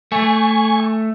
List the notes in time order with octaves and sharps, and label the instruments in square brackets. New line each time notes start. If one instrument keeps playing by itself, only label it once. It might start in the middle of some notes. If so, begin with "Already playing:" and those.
[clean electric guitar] A3 [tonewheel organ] G#5 C#6